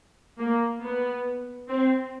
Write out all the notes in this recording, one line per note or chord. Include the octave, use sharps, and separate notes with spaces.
A#3
B3
C4